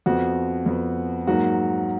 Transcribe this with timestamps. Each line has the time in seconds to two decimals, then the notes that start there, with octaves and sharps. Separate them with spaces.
0.06 F2 F3 B3 F#4
0.66 F2 F3 B3
1.27 G#2 F#3 A#3 F#4